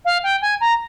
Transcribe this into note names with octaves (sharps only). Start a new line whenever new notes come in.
F5
G5
G#5
A#5